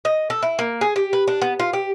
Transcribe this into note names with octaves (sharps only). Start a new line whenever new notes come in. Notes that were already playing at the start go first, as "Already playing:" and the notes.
D#5
A4
E4
A#3
G#4
G4
B4
D4
B3
F4
G4